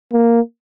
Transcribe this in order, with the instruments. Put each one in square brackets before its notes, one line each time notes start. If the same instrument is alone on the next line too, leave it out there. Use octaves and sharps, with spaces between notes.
[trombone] A#3